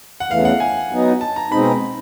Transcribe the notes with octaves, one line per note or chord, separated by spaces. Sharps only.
F#5
E2 C#3 E3 A3 F5
F#5
G#5
F#3 B3 D#4
A5
A#5
B2 G#3 C4 D#4 B5